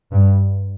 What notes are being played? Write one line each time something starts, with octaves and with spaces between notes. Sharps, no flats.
G2